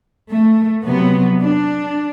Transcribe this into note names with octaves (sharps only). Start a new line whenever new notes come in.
A3
C3 F#3 B3
D4